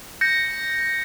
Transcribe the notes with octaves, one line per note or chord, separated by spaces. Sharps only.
G6 A#6 C#7